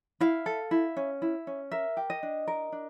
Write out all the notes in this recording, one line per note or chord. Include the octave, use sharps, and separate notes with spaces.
E4 F5
A4
E4
C#4
E4
C#4
A#4 E5
G4
D#5
D4
A#4
D4